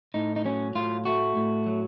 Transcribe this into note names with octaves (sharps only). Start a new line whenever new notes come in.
A2 D#4
D#4
F#3 C#4
A2 F4
A3 F#4
A2
F#3